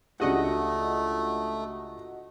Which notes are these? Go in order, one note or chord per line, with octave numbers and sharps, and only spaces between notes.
C#2 A3 D4 F#4 G4 D#5 F#5